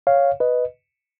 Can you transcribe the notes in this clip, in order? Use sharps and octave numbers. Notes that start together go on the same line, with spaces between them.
C#5 F5
B4 D#5